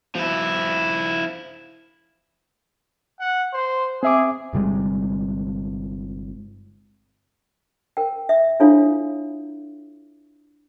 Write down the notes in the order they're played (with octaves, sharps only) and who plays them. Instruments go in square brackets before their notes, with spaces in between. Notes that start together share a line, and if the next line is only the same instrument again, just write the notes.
[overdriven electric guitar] F3 E4
[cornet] F#5
C5
[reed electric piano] C4 E5 D6 [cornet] G#4
[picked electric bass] G1 C3 G3 G#3
[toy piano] A#4 G5
E5
D4 E4 F4 A4 C#5 F5